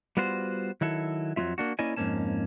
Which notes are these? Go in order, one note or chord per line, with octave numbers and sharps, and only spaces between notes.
G3 B3 F4 F#4 C5
D#3 F#3 E4 A4
F2 F#3 G#3 F4 E5
A#3 D4 F#4
A#3 C#4 E4 D5 D#5 G#5
F2 G#2 B2 A#3 C#4 A5